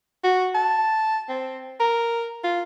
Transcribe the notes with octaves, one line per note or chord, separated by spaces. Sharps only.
F#4
A5
C4
A#4
F4